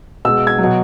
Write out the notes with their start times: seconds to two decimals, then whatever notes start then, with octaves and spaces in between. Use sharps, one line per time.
0.25 B2 G#3 E6
0.47 G#6
0.58 F#3
0.64 B2